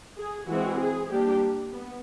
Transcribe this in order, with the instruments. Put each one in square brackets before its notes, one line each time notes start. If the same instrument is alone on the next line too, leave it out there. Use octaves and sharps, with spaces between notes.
[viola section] G#4
E3 G#3 C4 F#4
G#4
G3 A#3 D4 G4
B3